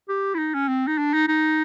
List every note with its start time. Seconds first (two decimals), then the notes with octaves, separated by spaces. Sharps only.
0.09 G4
0.34 E4
0.38 D#4
0.54 C#4
0.68 C4
0.87 D#4
0.98 D4
1.13 D#4
1.28 D#4